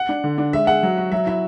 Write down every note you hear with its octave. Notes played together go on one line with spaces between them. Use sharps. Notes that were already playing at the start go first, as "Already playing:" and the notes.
Already playing: F#5
D4
D3
D4
G#3 E5
G#4 F#5
F#3
F#4
F#3 E5
E4 E5